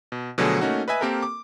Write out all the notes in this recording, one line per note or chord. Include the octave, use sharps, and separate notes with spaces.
B2
B2 D3 F3 F#3 A3 G#4
A3 A#3 C#4 D#4 F#4
B4 D#5 E5 G#5
A#3 C4 G4 A4 A#4
D6